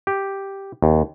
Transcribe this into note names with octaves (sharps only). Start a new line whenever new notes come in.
G4
D#2